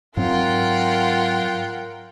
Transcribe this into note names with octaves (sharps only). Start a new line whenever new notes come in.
G#2 F#3 C4 F4 A#4 F#5 G5